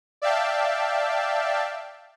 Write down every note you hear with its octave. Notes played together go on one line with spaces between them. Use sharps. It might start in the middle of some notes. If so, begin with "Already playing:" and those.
D5 E5 F5 G5 A5